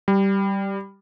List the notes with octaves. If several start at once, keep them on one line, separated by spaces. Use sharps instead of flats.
G3